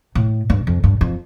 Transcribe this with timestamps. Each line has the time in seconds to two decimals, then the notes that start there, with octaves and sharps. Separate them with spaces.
0.15 A2
0.50 G2
0.67 F2
0.84 G2
1.01 F2